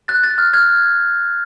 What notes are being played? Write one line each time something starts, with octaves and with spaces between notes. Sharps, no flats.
F#6 A6
F#6 A6
F6
F6 G#6